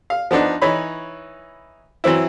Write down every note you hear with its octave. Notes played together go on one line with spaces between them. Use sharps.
F5
F3 B3 D4 D#4
E3 D#4 C#5 B5
E3 F#3 C4 E4